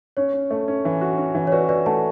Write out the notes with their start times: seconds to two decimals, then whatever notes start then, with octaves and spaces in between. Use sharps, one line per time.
0.17 C#4 C#5
0.33 C#4
0.51 A3
0.68 C#4
0.85 E3
1.01 F#4
1.18 C#4
1.35 E3
1.47 C#5
1.52 F#4 B4 D5
1.69 F#4 B4 D5
1.86 A3 F#5 A5